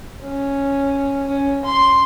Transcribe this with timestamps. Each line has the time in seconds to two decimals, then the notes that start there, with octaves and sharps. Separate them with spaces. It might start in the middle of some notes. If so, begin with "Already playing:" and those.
0.22 C#4
1.27 C#4
1.65 C6